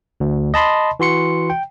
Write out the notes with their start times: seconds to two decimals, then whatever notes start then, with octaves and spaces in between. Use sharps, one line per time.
0.20 D2
0.54 D#5 A5 B5 C6
1.00 E3 F#4 C6 C#7
1.50 G5